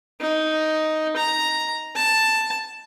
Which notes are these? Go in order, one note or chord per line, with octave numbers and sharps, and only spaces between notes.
D#4
A#5
A5